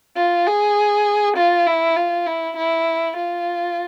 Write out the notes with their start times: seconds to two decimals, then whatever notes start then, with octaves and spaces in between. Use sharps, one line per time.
0.17 F4
0.47 G#4
1.37 F4
1.66 E4
1.96 F4
2.26 E4
2.56 E4
3.17 F4